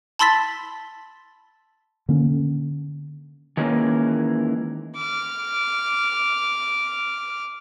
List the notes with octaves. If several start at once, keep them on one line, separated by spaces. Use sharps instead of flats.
A5 B5 C6 E6 A6 B6
D3 A#3 C#4
D#3 E3 G#3 A#3 C#4
D6 F6